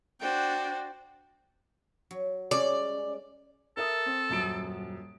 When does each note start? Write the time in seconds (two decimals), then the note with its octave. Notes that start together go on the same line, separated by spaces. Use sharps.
0.20 D4 F#4 C5 G5
2.11 F#3
2.51 G3 G#3 C#4 D5
3.77 A4 A#4 E5 D#6
4.06 C4
4.29 D#1 F#2 D7